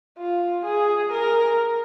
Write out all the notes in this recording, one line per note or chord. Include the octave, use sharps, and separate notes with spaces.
F4
G#4
A#4